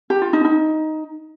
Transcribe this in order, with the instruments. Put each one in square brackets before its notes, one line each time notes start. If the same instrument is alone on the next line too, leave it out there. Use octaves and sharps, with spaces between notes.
[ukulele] G4
F4
D#4
D#4